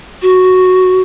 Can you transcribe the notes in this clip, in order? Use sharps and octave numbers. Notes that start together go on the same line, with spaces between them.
F#4